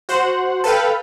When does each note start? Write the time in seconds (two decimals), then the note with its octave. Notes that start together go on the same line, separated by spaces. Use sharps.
0.09 F#4 C5 F#5
0.64 A4 B4 F5 G5